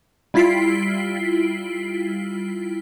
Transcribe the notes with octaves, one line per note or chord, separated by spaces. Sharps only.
G3 E4 F4 B6 C7 D7